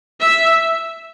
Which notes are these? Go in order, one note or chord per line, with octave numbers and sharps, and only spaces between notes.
E5